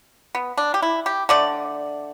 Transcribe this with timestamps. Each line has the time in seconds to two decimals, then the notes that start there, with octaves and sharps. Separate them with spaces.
0.35 B3
0.58 D4
0.74 G4
0.82 E4
1.06 G4
1.29 D3 A3 D5